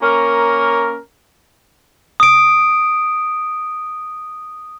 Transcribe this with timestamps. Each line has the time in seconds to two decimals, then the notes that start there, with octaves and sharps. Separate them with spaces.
0.02 A#3 C#4 A#4
2.20 D#6 D7